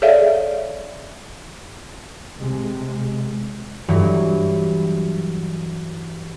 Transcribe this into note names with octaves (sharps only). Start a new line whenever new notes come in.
G#4 A4 C#5 D5 E5 F5
C3 G#3
G2 E3 F#3